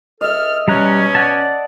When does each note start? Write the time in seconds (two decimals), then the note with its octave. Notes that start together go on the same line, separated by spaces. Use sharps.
0.21 C#2 A4 D#5 E5 F6
0.68 B2 G3 C#4 A#5 F#6
1.15 D5 F#5 A5